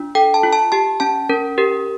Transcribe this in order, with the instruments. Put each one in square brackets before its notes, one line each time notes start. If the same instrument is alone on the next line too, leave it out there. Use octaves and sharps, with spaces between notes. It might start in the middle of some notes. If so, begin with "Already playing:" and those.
Already playing: [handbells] D4 F4
A4 G5
A5
F4
A5
G4 A5
C#4 A5
C#4 A#4
G4 A#4